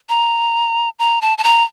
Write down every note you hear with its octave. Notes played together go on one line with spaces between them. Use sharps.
A#5
A#5
A5
A5
A#5